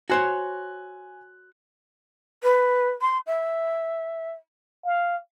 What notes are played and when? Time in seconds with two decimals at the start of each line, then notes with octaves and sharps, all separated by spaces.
0.10 F#4 C5 C#5 G#5 F#6
2.43 B4
3.01 C6
3.27 E5
4.86 F5